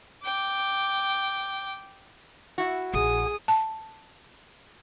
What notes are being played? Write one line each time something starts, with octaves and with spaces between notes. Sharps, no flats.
G5 D6
E4 F#4
A#1 G#4 D#6
A5